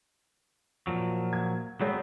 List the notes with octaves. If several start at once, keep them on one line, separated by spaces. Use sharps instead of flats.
A#2 F3 F#3
G#6
F#3 G#3 B3 C4 C#5